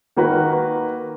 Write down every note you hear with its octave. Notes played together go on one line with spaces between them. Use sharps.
D#3 A#3 F#4 B4